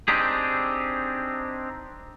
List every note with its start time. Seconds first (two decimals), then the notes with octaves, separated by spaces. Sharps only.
0.08 C4 D4 D#4 G4 G#4